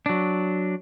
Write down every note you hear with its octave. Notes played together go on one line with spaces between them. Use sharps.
F#3 D4